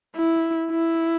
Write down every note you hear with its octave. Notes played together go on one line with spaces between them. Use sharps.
E4
E4